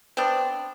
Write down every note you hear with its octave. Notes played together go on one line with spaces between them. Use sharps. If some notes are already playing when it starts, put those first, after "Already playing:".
B3 C4 D4